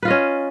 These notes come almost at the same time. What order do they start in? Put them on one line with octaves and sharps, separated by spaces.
B4 F4 D#5 C#4